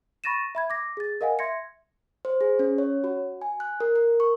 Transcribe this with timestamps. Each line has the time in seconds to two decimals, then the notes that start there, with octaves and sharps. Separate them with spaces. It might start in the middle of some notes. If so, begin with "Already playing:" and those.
0.24 B5 C#6 A6 A#6 D#7 E7
0.55 E5 B5 G#6
0.70 D6 A#6
0.97 G#4 A6
1.21 A#4 D#5 F5 F#5 G#5
1.39 E5 C6 G#6 A#6 C#7
2.25 C5
2.41 G#4
2.59 C#4
2.78 C#5
3.04 F#4
3.42 G#5
3.60 F#6
3.80 A#4
3.95 A#4
4.20 C#6